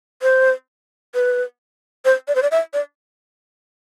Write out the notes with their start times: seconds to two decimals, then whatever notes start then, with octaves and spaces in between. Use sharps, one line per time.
0.22 C5
1.15 B4
2.05 C5
2.28 D5
2.35 C5
2.42 D5
2.51 E5
2.73 D5